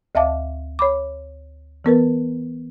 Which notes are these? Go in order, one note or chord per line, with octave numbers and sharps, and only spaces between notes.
D2 E5 F5 A5 D6
C#5 B5 D6
E3 B3 A#4 B4